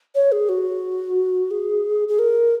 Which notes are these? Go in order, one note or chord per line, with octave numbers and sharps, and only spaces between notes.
C#5
G#4
F#4
G#4
G#4
A#4